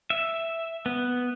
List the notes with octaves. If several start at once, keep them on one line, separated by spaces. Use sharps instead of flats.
E5
B3